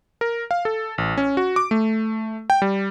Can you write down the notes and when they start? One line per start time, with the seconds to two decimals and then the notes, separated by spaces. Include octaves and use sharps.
0.21 A#4
0.51 F5
0.65 A4
0.98 A1
1.17 C#4
1.37 F#4
1.56 D6
1.71 A3
2.50 G5
2.62 G3